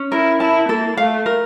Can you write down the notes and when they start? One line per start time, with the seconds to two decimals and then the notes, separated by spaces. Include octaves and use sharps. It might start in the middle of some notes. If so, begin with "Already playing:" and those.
Already playing: C#4
0.12 E4 A#4
0.40 E4 A5
0.69 A#3 A4
0.97 A3 F5
1.26 A#4